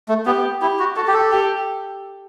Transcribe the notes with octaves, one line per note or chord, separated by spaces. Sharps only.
A3
B3 G4
E4 G4
F#4
F#4 A4
G4
A4
G4